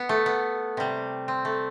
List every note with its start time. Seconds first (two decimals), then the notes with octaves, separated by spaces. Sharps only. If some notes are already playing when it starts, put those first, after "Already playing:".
Already playing: B3
0.09 A3
0.26 B3
0.77 C3 G3
1.28 C4
1.45 A3